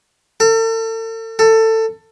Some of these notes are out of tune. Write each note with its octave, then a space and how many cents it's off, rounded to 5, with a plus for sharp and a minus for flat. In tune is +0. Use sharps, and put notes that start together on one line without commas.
A4 +40
A4 +20